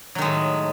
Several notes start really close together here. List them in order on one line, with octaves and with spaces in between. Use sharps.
F#3 D#3 G#3 A2